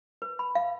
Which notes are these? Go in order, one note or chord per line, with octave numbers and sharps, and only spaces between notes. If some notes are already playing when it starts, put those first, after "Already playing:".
B4
B5
F5